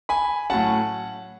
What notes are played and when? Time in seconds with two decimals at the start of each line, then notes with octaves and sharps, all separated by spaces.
0.09 G#5 B5
0.50 A2 F#3 C#4 F#5 A5